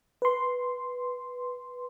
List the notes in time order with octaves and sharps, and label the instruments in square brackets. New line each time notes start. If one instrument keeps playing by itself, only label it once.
[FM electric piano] B4 C6